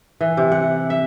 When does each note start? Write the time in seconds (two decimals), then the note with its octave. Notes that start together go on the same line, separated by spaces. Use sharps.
0.21 E3
0.37 C3
0.52 F#5
0.90 E5